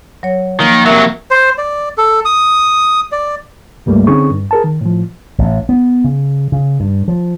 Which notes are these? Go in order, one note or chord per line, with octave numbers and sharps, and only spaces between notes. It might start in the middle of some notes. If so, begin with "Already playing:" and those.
F#3 C#5
D#3 F3 A#3
C3 F#3 A#4 E5
C5
D5
A4
D#6
D5
C#2 G2 G3 A3 A#3
D3 C4 C#4 D#4 G#4 C#6
G2
G#4 A#4 A5
D#3
A2 F3
A1
B3
C#3
C#3
G2
F3